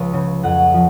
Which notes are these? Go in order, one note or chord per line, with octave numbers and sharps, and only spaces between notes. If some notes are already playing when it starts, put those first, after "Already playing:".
Already playing: C#2 F3 B4
C#3
F2 F#5
F3